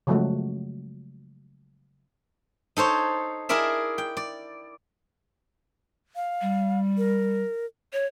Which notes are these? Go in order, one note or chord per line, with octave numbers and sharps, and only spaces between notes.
C#3 F3 F#3 G#3 A3 F#4
D#4 A4 C5 C#5
E4 G#4 A#4 D5 E5
G5
D5
F5
G3
A#4
C#5